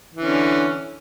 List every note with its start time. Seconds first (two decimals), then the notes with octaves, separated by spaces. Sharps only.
0.14 E3
0.19 D3
0.23 C#4